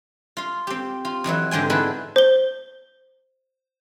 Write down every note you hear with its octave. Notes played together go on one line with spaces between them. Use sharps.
F4 F5
C4 G4
F4
F2 E3 F#3 E4
G#2 D3 C4 G5 G#5
G#3 B3 D4 E4 B4
C5 G7